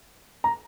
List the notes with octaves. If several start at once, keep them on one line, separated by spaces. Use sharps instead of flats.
A#5